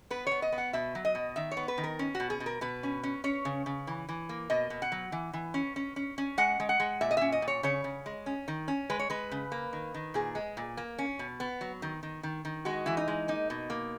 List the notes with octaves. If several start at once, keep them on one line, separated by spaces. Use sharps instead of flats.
B3 B4
B3 C#5
D#5
B3
F#5
B2 E5
F#3
D#5
B2
D#3 E5
C#5
B3
B4
D#3
A#4
C#4
F#4
B2
G#4
B2
A#4
B2 B4
C#4
C#4
C#4 C#5
C#3
C#3
E3
E3
A#3
B2 D#5
B2
F#5
F#3
E3
E3
C#4
C#4
C#4
C#4
G#3 F#5
G#3
F#5
G#3
A#2 E5
D#5
C#4 E5
D#5
A#2
C#5
C#3 C#5
C#3
G#3
C#4
D#3
C#4
G#3 B4
C#5
G#3 B4
C#3
A#3
D#3
D#3
A#2 G#4
G#3
A#2
A#3
C#4
B2
B3
F#3
D#3
D#3
D#3
D#3
G#3 F#4
E3 E4
D#4
G#3
A#3 D#4
B2
A#3